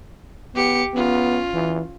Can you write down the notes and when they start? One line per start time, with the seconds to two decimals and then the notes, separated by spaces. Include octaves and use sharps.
0.55 B3 G4 C#7
0.94 B3 C#4 F4
1.54 E3